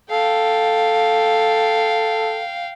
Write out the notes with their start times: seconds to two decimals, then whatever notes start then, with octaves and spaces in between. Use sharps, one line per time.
0.11 A4 F5 G5